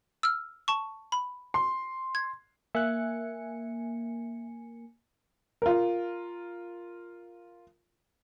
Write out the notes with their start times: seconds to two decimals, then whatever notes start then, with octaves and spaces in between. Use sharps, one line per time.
0.23 E6 F6
0.68 A5 C#6
1.12 B5
1.54 C6
2.15 G#6
2.75 A#3 E5 G#5 F#6 C#7
5.62 F4 A#4